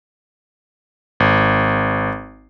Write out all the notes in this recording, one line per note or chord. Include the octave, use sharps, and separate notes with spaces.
G#1